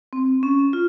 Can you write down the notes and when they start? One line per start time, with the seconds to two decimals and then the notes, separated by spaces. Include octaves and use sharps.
0.13 C4
0.43 C#4
0.73 F4